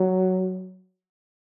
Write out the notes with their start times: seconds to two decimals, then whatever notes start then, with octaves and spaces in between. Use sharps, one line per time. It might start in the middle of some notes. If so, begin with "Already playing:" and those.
Already playing: F#3